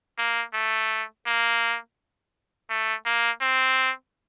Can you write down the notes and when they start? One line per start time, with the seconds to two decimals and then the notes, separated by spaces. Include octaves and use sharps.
0.19 A#3
0.54 A3
1.27 A#3
2.70 A3
3.06 A#3
3.41 C4